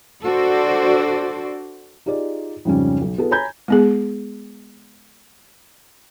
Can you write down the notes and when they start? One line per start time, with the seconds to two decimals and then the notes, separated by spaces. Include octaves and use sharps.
0.23 D4 F#4 A4 C5 D5
2.06 D#4 F4 G4 G#4 D5 D#5
2.65 F2 G#2 C#3 G3 C#4
3.02 B1
3.18 B3 E4 F#4 G#4 A4
3.31 C#5 G#5 A#5 B5 G6 G#6
3.68 G#3 B3 G#4